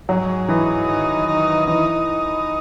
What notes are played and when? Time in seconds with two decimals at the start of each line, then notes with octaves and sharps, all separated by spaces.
0.09 G#2 F#3
0.48 E3 D#4
0.89 D#3
1.29 D#4
1.67 E3 D#4